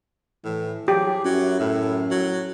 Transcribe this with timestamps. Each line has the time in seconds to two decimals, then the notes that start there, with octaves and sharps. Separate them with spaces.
0.44 A2 E3
0.88 F#3 G4 G#4
1.25 F#2 F#3 E4
1.60 A2
2.11 F#3